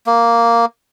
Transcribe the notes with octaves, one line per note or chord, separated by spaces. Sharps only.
A#3